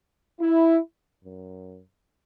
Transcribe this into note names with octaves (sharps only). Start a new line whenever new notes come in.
E4
F#2